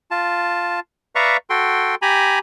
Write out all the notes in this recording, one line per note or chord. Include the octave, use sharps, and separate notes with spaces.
F4 A5
B4 D5 E5 F5 A#5 C#6
F#4 A4 G5 C6
G4 G#5 A#5 B5